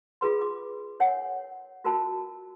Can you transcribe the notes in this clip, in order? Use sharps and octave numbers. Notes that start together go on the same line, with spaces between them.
F4 G#4 B4 C6
D6
A#4 C#5 F#5 G#5
F4 F#4 A#4 C5 A5